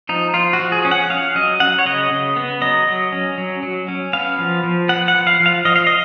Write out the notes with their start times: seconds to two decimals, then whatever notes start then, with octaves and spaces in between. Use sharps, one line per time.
0.09 F3 D#4
0.34 F3 F4
0.53 F#4
0.59 F3
0.72 G#4
0.85 C#4
0.91 F#5
1.10 C#4 F5
1.35 F#3 D#5
1.60 F#3 F#5
1.79 C#5
1.86 C#3 D#5
2.11 C#3
2.36 B3
2.61 F#3 D#5
2.87 F#3
3.12 C#4
3.38 F#3
3.63 F#3
3.88 C#4
4.13 B3 F5
4.39 F3
4.64 F3
4.89 B3 F#5
5.08 F#5
5.14 F3
5.27 F5
5.40 F3
5.46 F5
5.65 F3 D#5
5.76 F5
5.87 D#5